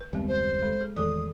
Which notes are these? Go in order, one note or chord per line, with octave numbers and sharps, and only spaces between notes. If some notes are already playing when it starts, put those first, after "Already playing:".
B4
F#1 D#2 G3 G#3 B3 C4
C5
G#3 A4 B5
G#4
A1 E2 D#3 G#3 A4 D5 D#6